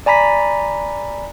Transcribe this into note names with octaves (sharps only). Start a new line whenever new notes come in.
D5 G#5 A#5 B5 B6